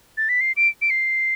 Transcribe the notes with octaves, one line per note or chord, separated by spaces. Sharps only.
A6
B6
C7
D7
D7
C7